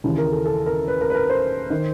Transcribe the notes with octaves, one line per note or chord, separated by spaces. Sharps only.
D#2 C#3 E3
A#4
A4
A4
A#4
B4
A#4
B4
A#4
C5
D#3